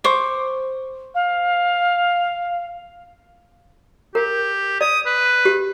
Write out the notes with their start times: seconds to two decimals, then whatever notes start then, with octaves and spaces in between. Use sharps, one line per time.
0.04 C5 C#6 D6
1.14 F5
4.15 G4 A#4
4.81 D5 D#6
5.06 B4
5.45 G4